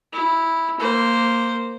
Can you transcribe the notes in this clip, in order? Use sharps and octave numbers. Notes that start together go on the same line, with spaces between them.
E4
A#3 C5